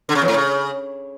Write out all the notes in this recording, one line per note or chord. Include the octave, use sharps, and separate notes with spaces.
D3
C#3
E2
A2
C#3